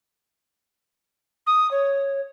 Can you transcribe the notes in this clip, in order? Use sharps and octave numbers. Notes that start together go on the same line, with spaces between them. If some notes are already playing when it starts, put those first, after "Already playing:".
D#6
C#5